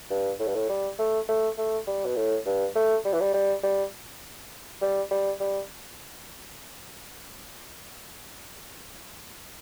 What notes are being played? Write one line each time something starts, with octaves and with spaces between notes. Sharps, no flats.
G2
A2
G2
A2
G3
A3
A3
A3
G3
B2
A2
G2
A3
G3
E3
G3
G3
G3
G3
G3
G3